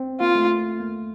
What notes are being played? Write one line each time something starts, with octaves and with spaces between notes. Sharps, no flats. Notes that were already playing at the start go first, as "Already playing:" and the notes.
Already playing: C4
A#3 F4
A3
A#3